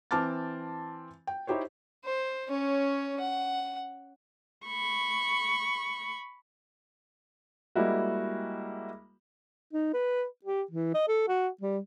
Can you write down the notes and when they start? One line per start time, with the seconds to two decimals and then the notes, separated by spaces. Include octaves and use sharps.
0.11 E3 C4 A5 D6 F6 A6
1.27 G5
1.47 D#4 E4 G4 C5 C#5
2.05 C5
2.49 C#4 C#5
3.20 F#5
4.66 B5 C#6
7.75 G3 G#3 A#3 E4 F#4
9.73 D#4
9.93 B4
10.44 G4
10.71 E3
10.94 D#5
11.08 A4
11.28 F#4
11.61 G3